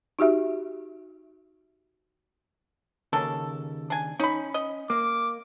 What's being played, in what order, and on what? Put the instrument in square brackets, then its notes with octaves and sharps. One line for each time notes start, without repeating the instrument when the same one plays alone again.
[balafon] D#4 F#4 G4 E5
[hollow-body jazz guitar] D#2 C#3 A#4 [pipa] A4
[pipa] D4 G#5
[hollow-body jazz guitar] C#4 [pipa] D#4 B5
[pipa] D#5
[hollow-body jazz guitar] A#3 [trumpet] D6